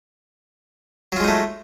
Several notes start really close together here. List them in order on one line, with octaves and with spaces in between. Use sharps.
F#3 F4 G#3 D#4 A3